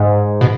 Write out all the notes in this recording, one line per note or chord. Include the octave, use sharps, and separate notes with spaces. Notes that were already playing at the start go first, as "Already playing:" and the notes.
Already playing: G#2
B2